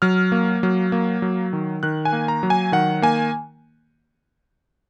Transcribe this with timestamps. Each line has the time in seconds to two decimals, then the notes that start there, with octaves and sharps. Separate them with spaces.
0.02 F#3 F6
0.32 A#3
0.63 F#3
0.92 A#3
1.22 F#3
1.53 D#3
1.83 D#3 F#6
2.05 G#5
2.13 A#3
2.28 A#5
2.43 F#3
2.50 G#5
2.72 D#3 F#5
3.02 A#3 G#5